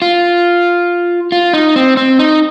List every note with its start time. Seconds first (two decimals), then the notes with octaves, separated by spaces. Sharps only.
0.02 F4
1.32 F4
1.53 D#4
1.76 C4
1.97 C4
2.19 D#4